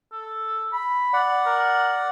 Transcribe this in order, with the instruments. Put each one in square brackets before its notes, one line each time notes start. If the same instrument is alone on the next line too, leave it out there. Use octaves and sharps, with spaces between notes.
[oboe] A4
B5
[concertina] D5 F#5
[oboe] A#4